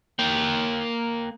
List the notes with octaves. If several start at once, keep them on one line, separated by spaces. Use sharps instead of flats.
A#3 G5